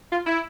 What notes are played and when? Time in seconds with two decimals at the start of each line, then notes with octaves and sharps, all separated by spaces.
0.12 F4
0.26 E4